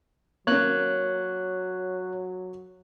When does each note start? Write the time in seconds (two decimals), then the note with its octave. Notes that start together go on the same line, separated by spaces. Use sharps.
0.47 F#3 A#3 C#4 C#5 F#6